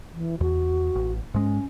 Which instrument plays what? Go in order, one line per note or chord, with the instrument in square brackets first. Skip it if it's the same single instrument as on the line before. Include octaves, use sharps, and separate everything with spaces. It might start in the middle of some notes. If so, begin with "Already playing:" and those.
[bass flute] E3
[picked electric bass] E2 [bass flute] F#4
[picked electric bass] A1
[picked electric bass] G#2 G#3 [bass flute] C#4